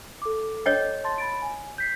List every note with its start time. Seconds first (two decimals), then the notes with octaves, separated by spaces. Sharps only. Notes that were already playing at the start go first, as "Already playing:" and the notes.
0.22 A4 D6
0.66 C#5 D#5 G5
1.04 A5 C6 A6
1.18 B5 A6 D7
1.42 G#5
1.78 G6 B6 C7